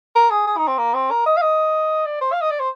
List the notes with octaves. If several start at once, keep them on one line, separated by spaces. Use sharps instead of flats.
A#4
G#4
G#4
D#4
C4
A#3
C4
A#4
D#5
F5
D#5
D5
C5
F5
D#5
D5
C5